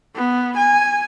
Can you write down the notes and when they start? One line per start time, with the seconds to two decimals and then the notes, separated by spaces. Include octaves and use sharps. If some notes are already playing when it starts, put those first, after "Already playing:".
0.16 B3
0.57 G#5